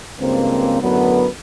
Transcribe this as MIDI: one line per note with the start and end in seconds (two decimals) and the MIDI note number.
0.19 0.79 37
0.19 0.79 43
0.19 0.79 49
0.19 0.79 58
0.19 0.79 60
0.81 1.26 42
0.81 1.26 45
0.81 1.26 50
0.81 1.26 54
0.81 1.26 59